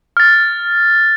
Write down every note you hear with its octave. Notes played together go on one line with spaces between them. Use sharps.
F6 A6